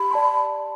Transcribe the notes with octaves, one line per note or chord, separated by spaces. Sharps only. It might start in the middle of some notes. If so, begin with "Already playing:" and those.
Already playing: G4 B5
D5 A5 C6